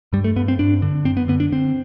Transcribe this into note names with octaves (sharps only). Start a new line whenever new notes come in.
G2 G3
A3
G2 B3
C4
G2 D4
D3
F#2 C4
B3
D3 B3
D4
D3 C4